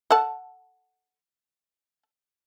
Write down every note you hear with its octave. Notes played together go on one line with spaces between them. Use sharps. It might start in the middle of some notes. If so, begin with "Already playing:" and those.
A4 F#5 A5